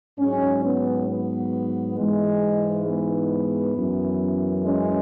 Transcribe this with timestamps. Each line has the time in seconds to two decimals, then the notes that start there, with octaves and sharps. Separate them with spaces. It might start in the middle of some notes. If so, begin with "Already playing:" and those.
0.19 G#2 F#3 G#3 C#4
0.64 B3
1.09 B3
1.97 G#2 E3 G#3
2.86 B3
3.76 F#2 E3
4.64 G#3 C#4